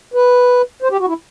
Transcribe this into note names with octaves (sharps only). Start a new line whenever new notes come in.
B4
C5
G4
F#4
E4